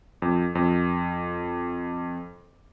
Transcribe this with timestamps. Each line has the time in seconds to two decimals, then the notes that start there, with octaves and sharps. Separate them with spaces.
0.22 F2
0.55 F2